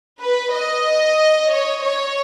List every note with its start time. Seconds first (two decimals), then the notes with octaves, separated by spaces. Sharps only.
0.20 B4
0.52 D#5
1.51 C#5
1.83 C#5